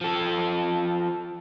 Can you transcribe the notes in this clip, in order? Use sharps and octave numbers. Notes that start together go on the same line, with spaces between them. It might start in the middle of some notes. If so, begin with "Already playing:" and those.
F3 A4